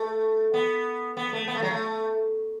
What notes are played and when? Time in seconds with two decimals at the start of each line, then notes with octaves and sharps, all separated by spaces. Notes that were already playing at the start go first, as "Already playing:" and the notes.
Already playing: A3
0.54 B3
1.17 B3
1.33 A3
1.48 B3
1.55 A3
1.62 F#3
1.71 A3